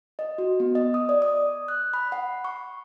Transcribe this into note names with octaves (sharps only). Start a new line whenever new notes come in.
D#5
F#4
B3
D#5
D#6
D5
D#6
F#6
B5
F#5
C#6